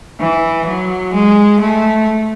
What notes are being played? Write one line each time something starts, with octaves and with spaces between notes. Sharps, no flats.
E3
F#3
G#3
A3